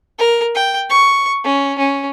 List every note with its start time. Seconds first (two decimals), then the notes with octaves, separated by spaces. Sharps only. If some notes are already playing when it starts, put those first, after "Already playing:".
0.19 A#4
0.55 G5
0.90 C#6
1.44 C#4
1.78 C#4